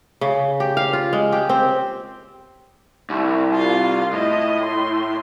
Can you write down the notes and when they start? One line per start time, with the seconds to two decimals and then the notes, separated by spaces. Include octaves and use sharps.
0.21 C#3
0.60 G4
0.77 F5
0.93 F4
1.13 G#3
1.32 G4
1.49 C4
3.10 C2
3.53 F4 F5
4.13 A2 D#5
4.65 C6